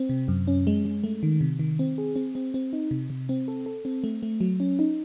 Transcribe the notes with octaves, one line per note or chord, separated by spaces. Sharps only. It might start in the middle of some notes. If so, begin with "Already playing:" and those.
Already playing: C4
C3
F#2
C#4
G#3
G#3
A3
D#3
C3
D#3
C4
G#4
C4
C4
C4
D#4
C3
C3
C4
A4
A4
C4
A3
A3
F#3
C#4
D#4